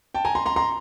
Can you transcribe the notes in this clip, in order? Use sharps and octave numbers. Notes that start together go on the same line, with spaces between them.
G5 A5
G#5 A#5
A#5 C6
A#5 C6
A#5 C6